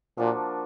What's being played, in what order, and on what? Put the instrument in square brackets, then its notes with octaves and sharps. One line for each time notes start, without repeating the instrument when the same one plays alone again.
[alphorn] A#2 [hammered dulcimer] F3 A#3 D4 F#4